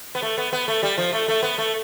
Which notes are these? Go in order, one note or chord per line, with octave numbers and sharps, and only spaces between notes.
B3
A3
B3
B3
A3
G3
F3
A3
A3
B3
A3